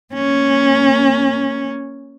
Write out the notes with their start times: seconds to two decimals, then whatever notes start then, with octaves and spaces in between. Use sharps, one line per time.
0.14 A#3 C#4